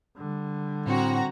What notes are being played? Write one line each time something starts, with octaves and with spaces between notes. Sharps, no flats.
D3 G3
A2 C4 F#4 A#5